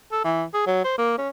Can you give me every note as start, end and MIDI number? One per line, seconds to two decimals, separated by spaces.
0.12 0.22 69
0.24 0.44 52
0.54 0.63 68
0.66 0.84 54
0.84 0.97 72
0.98 1.16 58
1.18 1.29 61